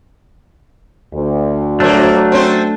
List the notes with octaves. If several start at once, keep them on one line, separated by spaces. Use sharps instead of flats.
D2
F3 F#3 A3 A#3 D4
C4 C#4 C5